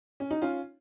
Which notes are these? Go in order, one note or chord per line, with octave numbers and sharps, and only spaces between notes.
C#4
D#4
C#4 F4